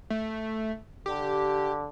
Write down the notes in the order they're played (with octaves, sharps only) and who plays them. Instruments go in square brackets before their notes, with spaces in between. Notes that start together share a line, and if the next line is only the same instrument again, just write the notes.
[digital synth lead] A3
[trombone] D3 [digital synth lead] G4